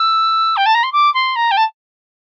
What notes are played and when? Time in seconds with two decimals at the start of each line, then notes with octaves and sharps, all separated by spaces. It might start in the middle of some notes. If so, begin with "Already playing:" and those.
Already playing: E6
0.56 G5
0.66 A5
0.74 A#5
0.83 C6
0.92 D6
1.14 C6
1.35 A#5
1.51 G5
1.57 A5